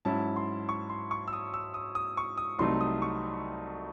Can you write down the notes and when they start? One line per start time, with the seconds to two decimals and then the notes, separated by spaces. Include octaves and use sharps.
0.05 G#2 F#3 C#4 E4 A5
0.36 C6
0.69 C#6
0.90 C6
1.11 C#6
1.28 E6
1.33 D#6
1.54 E6
1.74 D#6
1.95 D#6
2.17 C#6
2.37 D#6
2.59 C2 C3 F#3 A3 D#4 C6
2.81 D#6
3.02 C#6